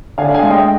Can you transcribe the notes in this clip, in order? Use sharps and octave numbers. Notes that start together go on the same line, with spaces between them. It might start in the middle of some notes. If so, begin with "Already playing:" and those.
D3 F5 G#5
F5 G#5
G#3
D#5 G5